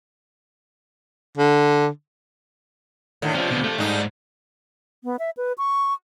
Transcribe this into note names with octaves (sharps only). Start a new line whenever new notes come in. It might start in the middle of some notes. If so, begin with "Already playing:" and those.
D3
A2 D3 D#3
C3 F3 C#4 F4
D2 B2
A3 A4
G#2 G3 A3 D#4
B3
E5
B4
C#6